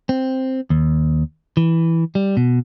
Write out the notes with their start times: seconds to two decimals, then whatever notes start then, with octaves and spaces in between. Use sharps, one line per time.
0.09 C4
0.70 D#2
1.57 E3
2.15 G3
2.37 B2